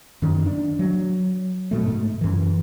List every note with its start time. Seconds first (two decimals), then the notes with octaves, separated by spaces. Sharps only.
0.22 F#2 D#3
0.46 D4
0.79 F#3
1.71 B2 A3
1.84 G#2
2.21 F#2 E3